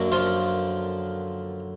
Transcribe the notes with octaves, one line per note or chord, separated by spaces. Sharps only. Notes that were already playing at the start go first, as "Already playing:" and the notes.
Already playing: F#2 D3 F#3 A#3
F3 F4